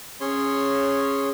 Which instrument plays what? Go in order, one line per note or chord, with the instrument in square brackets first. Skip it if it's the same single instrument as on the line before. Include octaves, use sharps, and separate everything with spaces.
[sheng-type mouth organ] C#4 G#4 C#5 C6